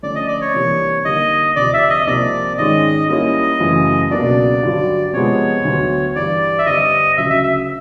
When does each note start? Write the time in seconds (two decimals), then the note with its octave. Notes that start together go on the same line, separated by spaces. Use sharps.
0.03 D3 F3 A3 C#4 D5
0.15 D#5
0.28 D5
0.41 C#5
0.54 C3 E3 G3 A#3 D4
1.05 D3 G3 A#3 D#4 D#5
1.56 D2 C3 F3 D5
1.74 E5
1.90 D#5
2.07 C2 C3 F3 A#3 D5
2.58 G#2 D#3 G#3 C#4 D#5
3.09 G3 A#3 C#4 E4 D#5
3.60 F#2 C#3 E3 A3
4.11 C#2 B2 F#3 A#3 D4 D5
4.62 G2 D3 F#3
5.13 C3 F3 G#3 B3 C#5
5.65 D2 D3 F#3 B3
6.16 G2 E3 G3 D5
6.59 E5
6.66 G2 D3 G3 C4 D#5
7.17 D2 C#3 F#3 E5
7.30 E5
7.43 E5